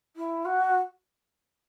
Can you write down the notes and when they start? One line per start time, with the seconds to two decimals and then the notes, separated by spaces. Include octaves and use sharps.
0.17 E4
0.45 F#4